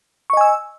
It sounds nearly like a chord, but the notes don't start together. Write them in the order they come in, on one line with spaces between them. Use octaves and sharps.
C#6 D#5 G#5 E6